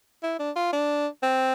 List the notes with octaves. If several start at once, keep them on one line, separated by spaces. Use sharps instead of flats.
E4
D4
F4
D4
C4